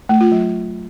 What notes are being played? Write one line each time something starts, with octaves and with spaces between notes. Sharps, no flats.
A3
F4
F#3